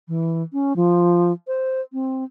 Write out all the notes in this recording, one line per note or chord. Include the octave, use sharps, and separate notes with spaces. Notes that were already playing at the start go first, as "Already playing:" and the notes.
E3
C#4
F3
C5
C4